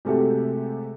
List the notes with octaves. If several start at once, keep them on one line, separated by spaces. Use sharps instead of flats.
C3 G#3 A3 F#4 G4 A4